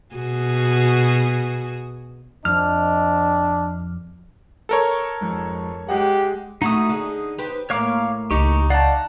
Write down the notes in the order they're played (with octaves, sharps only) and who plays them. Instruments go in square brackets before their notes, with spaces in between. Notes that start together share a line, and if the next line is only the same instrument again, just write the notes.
[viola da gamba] B2 F#4 G#4
[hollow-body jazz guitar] F2 [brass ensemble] C4 D#5 [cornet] D4 [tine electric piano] F6
[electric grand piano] A4 A#4 C#5
[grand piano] F2 G#2
[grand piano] G#3 D#5 F#5 [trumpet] G4
[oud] A3 E4 F#4 [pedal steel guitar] D#4 D#6
[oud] D3 G#4
G4 B4 C5
[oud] A2 A#3 [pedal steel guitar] C#5 F5 D6
[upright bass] C#2 [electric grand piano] D#4 C#6 [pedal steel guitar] G4
[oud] D#4 [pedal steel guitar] D5 F5 [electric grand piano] F#5 A5